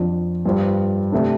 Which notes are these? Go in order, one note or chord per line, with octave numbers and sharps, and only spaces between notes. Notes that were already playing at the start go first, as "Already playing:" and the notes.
Already playing: F2 F3 D4
G2 G3 F4 C5
C3 A3 D4